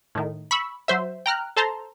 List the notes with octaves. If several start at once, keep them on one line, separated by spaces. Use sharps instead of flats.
A2 D#3
B5 C#6 E6
F#3 C5 E5
G5 A#5 F6 F#6
A4 C5 A5 A#5 C6